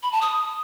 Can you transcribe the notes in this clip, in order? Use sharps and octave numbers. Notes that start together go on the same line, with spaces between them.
B5
A5
D#6